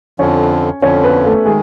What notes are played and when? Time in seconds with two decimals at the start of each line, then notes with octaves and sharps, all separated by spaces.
0.19 F2 D3 F3 C#4 C#5
0.82 F2 D3 F3 C#4 C#5
1.03 B3 B4
1.25 A3 A4
1.45 D#3 G#3 G#4